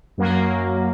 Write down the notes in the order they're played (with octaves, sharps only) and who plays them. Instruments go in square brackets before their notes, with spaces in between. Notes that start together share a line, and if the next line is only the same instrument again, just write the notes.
[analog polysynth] F#2 F#3 A#3